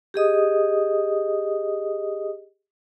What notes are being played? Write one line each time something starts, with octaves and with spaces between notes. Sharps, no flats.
G4 G#4 D#5 D#6